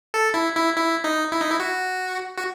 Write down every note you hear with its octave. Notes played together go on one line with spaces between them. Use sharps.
A4
E4
E4
E4
D#4
E4
D#4
E4
F#4
F#4